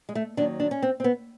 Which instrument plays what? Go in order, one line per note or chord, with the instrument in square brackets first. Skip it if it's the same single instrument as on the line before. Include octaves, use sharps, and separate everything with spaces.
[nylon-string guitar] G#3
A3
D#2 D#3 F#3 D4
D4
C#4
C4
C4
B3